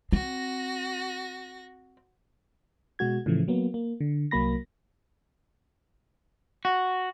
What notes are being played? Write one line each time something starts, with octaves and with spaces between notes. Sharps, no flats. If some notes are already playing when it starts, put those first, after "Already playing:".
C4 F#4 A#6
B2 G#3 F#4 G#6
A2 C#3 E3 F3 A3
F#3 A#3 B3
A#3
D3
C2 F#3 A#3 B5 A#6
F#4